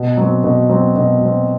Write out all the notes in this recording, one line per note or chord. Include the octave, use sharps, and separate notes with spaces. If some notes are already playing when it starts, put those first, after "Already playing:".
Already playing: B2
F#3 C4
B2
F#3 C4
B2
F#3 C4